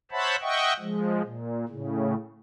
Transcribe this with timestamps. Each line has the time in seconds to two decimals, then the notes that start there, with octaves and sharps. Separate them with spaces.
0.11 C5 C#5 E5 F#5 A5 B5
0.42 D#5 E5 F#5 G5 C#6
0.79 F3 G#3
1.22 A#2
1.69 A2 C#3